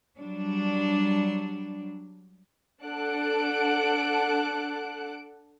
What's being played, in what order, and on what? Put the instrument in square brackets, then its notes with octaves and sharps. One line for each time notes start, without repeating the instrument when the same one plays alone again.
[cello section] F#3 G3 D4
[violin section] D4 A4 F#5 A5 F#6 D7